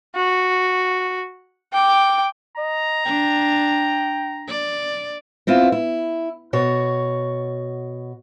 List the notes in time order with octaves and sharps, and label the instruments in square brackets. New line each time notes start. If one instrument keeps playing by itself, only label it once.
[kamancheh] F#4
G5 D6
[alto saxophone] D#5 [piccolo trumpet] A#5
[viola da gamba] D4 [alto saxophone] G5
[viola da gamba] D5
[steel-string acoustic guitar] B3 C4 E4 F4
E4
B2 F#4 C#5